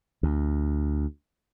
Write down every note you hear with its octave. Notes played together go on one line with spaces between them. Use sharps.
D2